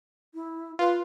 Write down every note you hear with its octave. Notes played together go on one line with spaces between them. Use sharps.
E4
F4 B4